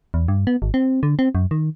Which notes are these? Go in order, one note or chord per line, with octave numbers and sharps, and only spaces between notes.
E2
G2
B3
G#1
C4
D3
C4
F#2
D#3